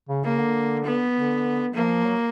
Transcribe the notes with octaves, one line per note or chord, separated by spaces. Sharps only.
C#3
C#3 A#3
D3
B3
D3
F3 A#3
F#3